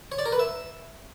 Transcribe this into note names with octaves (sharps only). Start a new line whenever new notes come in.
C#5
D5
A#4
B4
E5